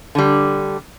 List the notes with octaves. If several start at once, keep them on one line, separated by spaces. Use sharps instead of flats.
D3 G3